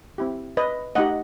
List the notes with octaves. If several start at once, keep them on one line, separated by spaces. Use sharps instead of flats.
C4 E4 G4
B4 D#5
A3 D#4 G4 D#5 F#5